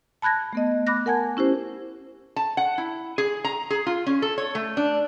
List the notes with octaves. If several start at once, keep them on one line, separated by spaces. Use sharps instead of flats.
A5 B5 F#6 G#6 A#6
A3 B3 D#5
B5 D6 F#6 A#6
A#4 F#5 G#5 A5 G#6
C#4 E4 G4 C5
A5
F#5
E4
G#4
A#5
G#4
F4
C#4
A4
C#5
A3
D4